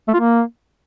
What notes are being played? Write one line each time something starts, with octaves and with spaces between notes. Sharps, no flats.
A3
F4
A#3